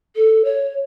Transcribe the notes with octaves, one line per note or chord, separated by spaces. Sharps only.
A4
C#5